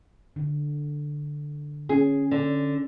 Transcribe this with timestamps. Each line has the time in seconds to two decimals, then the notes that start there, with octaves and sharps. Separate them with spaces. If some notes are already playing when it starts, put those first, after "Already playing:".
0.36 D3
1.89 C#4 G#4
2.31 D3